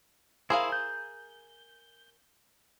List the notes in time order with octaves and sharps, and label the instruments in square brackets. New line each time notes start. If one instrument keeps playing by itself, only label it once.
[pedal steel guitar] E4 C5 [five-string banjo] G#4 A#4 F5
[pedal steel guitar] G6